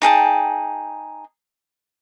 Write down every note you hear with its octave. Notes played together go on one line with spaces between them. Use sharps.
D#4 G#4 G5 A5